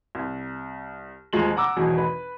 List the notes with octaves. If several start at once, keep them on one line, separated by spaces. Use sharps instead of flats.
C2
D#1 F3 G#3 F#7
F#5 A#5 D6 E6
G#1 E2 B2 F#3 F#4 G#4
B4